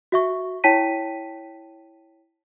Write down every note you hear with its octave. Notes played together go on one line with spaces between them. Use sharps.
F#4 E5 C#6
E4 C#5 G5 A5 B6 D#7